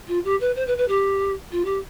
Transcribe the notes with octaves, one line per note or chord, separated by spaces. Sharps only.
F4
G4
B4
C5
B4
B4
G4
F4
G4